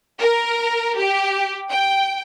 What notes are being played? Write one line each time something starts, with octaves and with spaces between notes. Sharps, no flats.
A#4
G4
G5